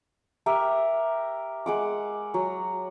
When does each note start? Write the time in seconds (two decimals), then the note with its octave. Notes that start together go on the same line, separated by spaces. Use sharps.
0.46 G4 A#4 E5
1.66 G#3 F#5 D6
2.34 F#3